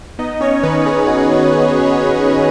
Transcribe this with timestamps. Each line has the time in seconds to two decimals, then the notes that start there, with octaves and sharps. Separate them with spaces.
0.19 B3 D#4 D#5
0.41 B3 C#4 C#5
0.63 D#3 B3 B4
0.86 D#3 G#4
1.07 B3 F#4
1.30 B3
1.52 D#3 F#4
1.75 D#3
1.97 B3
2.19 B3